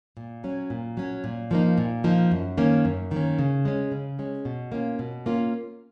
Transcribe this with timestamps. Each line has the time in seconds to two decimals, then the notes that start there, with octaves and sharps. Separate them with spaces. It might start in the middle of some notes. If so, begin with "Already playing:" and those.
0.17 A#2
0.44 F#3 C#4
0.70 A#2
0.97 F#3 C#4
1.24 A#2
1.51 F3 A#3 D#4
1.78 A#2
2.04 F3 A#3 D#4
2.31 F#2
2.57 D#3 A#3 C#4
2.85 F#2
3.11 D#3 A#3 C#4
3.39 C#3
3.65 G#3 C#4
3.92 C#3
4.19 G#3 C#4
4.45 B2
4.72 A#3 C#4 F4
4.99 B2
5.26 A#3 C#4 F4